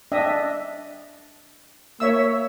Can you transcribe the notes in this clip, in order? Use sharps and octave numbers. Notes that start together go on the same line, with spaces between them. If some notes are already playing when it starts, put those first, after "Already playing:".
D4 D#5 E5
A#3 C#5 E5 E6